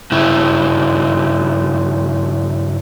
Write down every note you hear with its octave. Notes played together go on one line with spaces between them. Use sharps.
G2 C#3 E4